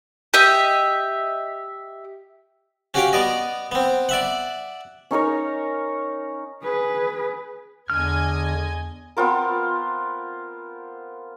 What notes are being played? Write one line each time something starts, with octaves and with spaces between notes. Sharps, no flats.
G4 D#5 E5
C#4 F#4 G4 C#5 F5 G5
B3 D5 D#5
B3 C4
D5 E5 F#5
C#4 D#4 A#4 C#5
G#4 B4
E2 D3 D#5 G#5 F6 G#6
B3 C4 F4 A#4